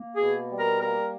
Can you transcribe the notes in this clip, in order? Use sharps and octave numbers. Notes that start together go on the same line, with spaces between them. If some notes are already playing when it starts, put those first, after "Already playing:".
Already playing: A#3
G#4
B2
G3
A#4
A#3 A#4